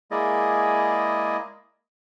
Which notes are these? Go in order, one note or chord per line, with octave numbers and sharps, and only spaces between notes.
G#3 A#3 E4 G#4 D5 D#5